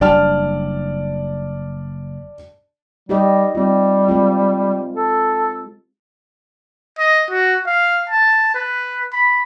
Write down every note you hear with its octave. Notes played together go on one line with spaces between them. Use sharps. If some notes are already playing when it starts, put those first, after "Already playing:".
F#1 G3 D4 D5 A5 F6
G3 D#4 G4 D#5
G3 C4 F4
G#3 C4 F4
A4
D#5
F#4
F5
A5
B4
B5